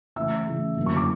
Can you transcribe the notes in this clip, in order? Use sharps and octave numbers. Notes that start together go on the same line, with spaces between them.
C#3 E3 A3 E5 E6
C#3 E3 A3
F#2 D3 F#3 A#3
C#6
D6